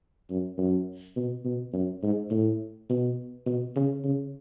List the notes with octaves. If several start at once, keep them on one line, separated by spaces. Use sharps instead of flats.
F#2
F#2
B2
B2
F#2
G#2
A2
B2
B2
C#3
C#3